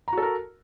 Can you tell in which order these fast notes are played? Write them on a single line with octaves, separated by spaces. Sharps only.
A#5 F#4 A4 A#4